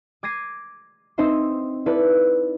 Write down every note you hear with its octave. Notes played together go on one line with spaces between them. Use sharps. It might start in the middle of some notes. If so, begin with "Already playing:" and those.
D6 G#6 A#6 C7 D#7
C4 D#4 C5 D#5 E5 C6
E4 A4 B4 D5